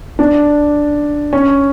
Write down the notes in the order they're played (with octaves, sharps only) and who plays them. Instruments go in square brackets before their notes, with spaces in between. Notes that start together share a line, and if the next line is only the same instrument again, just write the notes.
[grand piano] D4
C#4